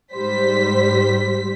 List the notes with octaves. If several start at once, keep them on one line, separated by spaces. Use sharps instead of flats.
G#2 G3 C5 B6